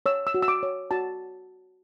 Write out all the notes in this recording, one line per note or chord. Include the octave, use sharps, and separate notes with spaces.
C#5 E6
E6
F#4
E6
D6
C#5
F#4 A5